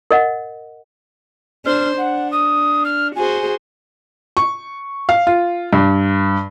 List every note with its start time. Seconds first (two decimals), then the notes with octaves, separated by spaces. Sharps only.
0.11 A#4 D#5 F#5
1.65 D4 C5 F6
1.97 D4 F#5
2.31 D#6
2.84 F6
3.16 F#4 G#4 C5 G#5
4.37 C#6
5.09 F5
5.27 F4
5.73 G2